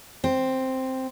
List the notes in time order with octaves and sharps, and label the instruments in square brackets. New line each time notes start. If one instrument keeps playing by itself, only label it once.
[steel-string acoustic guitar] C4